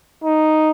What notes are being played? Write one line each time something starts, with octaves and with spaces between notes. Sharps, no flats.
D#4